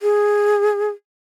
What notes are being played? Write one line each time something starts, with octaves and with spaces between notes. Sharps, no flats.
G#4